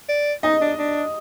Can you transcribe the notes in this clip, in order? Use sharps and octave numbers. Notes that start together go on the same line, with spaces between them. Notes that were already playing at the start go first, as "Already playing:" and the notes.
D5
D#4 D#5
D4
D4